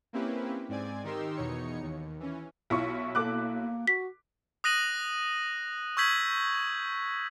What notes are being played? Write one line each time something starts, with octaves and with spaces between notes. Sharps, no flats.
A#3 C4 C#4 E4 G4 B4
G#2 C4 D5 G#5 G#6
D#3 D#4 G4 A#4 C6 E6
E2 B2 D#4 C#5 C#7
D#2
E3 C#4
B1 E4 F4 C#6
A#3 A4 D6 F#6
F#4 B6
D#6 F#6 A#6 D#7 F#7
C#6 E6 G6 G#6 B6 F#7